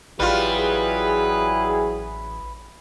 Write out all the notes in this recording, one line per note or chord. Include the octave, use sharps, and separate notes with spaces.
A1 F#3 G3 E4 F4 G#4 B4